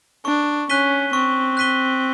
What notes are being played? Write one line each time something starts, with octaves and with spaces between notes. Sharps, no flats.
D4 C#6
C#4 F#6 B6 D#7 G7
C4 C#6
F#6 B6 D#7 G7